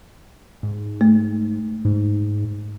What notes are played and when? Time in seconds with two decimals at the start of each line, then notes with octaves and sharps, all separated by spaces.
0.63 G#2
1.01 A3
1.85 G#2